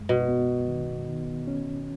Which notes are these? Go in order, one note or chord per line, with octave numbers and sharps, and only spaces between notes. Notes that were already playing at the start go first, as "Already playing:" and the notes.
Already playing: F#2 G#3
B2
B3
D#3
D#3
C#4